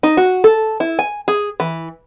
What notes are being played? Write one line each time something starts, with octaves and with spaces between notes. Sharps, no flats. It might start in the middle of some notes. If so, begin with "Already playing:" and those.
D#4
F#4
A4
E4
G#5
G#4
E3